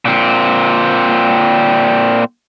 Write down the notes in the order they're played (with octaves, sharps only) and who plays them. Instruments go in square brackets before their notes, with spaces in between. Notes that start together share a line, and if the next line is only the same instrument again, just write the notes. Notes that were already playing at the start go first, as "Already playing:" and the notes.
[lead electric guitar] A#2 C4